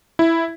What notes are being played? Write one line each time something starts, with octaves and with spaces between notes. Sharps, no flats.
E4